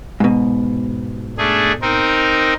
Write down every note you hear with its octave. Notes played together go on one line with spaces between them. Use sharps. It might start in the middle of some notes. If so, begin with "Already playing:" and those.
G#2 B2
A3 D4 G#4
C4 D#4 A#4